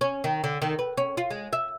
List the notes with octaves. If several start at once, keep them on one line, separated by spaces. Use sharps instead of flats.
C#4
D#3
D3
D#3
B4
C#4
F4
G#3
E5